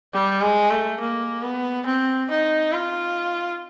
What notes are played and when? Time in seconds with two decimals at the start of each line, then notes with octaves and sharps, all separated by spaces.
0.13 G3
0.41 G#3
0.70 A3
1.00 A#3
1.42 B3
1.86 C4
2.30 D#4
2.73 F4